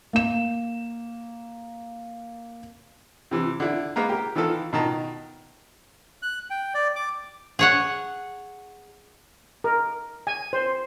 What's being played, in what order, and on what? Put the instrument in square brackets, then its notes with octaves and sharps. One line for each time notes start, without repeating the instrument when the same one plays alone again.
[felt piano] A#3 E7
[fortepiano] C3 E3
D3 E4
G#3 A#3 B3 A#4
G4 A#4
D#3 E3 B3 F4 A4
B2 D#3 A5 A#5
[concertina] F#6
G5
D5
D6
[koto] G#4 C#5 F#5
[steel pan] A#4
G#5
C5